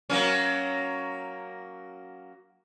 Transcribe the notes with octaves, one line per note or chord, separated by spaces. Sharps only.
F#3 A#3 C#4